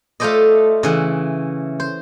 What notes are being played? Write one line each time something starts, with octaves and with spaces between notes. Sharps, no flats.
A3 F4 A4 C5 D5 D#5
C#3 E3 F#5
C5